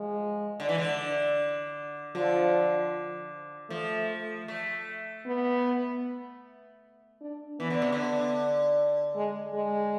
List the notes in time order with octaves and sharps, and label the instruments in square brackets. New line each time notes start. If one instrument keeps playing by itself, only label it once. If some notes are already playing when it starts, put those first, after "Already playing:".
Already playing: [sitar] F3 [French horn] G#3
[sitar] D3
E3
D3
[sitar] D3 [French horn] F3
[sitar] F3 [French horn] A3
[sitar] A3
[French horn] B3
D4
[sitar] E3 [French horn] B3
[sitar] D3
C3
D3
[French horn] G#3
G#3